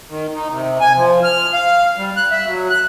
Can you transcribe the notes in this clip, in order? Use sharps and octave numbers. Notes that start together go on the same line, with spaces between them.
D#3
D#4
C3
G#5
F3
F6
F5
G3
F#6
E5
F#3
F#6